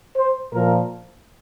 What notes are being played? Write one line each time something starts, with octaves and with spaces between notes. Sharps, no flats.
C5
A#2 F3 A#4